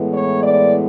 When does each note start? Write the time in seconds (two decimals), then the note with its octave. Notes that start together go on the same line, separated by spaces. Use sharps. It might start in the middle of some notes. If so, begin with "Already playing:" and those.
Already playing: A2 E3 G#3 B3
0.14 C#5
0.43 D5